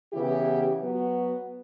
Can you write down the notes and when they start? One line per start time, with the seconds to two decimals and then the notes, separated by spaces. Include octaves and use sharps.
0.13 C#3 E3 B3 E4 G4
0.80 F#3 B3 F#4